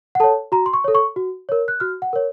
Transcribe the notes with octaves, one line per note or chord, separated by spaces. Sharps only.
F#5
A4 C#5 A5
F#4 A#5
C6
C#6
A4 C#5
C#6
F#4
A#4 C#5
F#6
F#4 F6
F#5
A#4 C#5